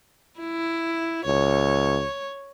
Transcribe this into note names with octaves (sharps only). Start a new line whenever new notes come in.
E4
C#2 C#5